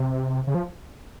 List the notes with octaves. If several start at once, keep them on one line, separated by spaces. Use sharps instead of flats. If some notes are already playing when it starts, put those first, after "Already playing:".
Already playing: C3
C#3
F3